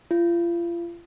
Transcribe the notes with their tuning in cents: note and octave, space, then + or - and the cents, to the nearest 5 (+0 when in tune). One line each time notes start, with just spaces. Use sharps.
F4 -35